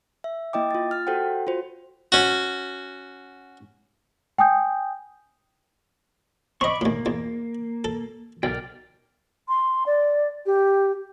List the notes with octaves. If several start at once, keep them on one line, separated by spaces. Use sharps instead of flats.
E5
A#3 E4 D#5 G5 D6
F4 A6
F6 A6
F#4 A4 C5 F#5 G5
F4 F#4 C5
C#4 F#4
G5 G#5 D#6 G6
C4 D5 D#5 B5 C#6
D#2 A2 A#3
E2
A4
B1 A#4 D5 G5
C6
D5
G4